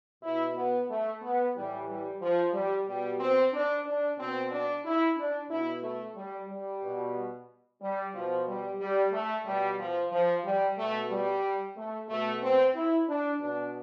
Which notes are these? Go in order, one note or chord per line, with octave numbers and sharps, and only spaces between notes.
B2 E4
B3
A3
B3
A2 E3 G3
G3
F3
G3
B2 G3
C4
D4
D4
B2 C4
D4
E4
D4
B2 E4
A3
G3
G3
B2
G3
B2 F3
G3
G3
A3
B2 G3
F3
F3
G3
B2 A3
G3
A3
B2 A3
C4
E4
D4
B2 D4